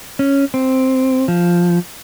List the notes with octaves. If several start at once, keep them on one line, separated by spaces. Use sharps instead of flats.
C#4
C4
F3